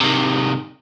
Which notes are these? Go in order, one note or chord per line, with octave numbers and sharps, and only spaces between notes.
C3 D#3